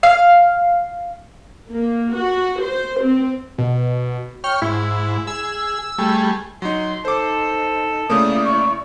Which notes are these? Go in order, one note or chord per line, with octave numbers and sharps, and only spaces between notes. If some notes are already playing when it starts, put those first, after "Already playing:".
F5
A#3
F#4
C5
C4
B2
C#5 G5 F6
G#2 E4
G#4 E6
G3 A3 G#4
F#3 D#4 C6
D#4 A4 C5 D6
C#3 A3 A#3 E4 D5 D#6
C#6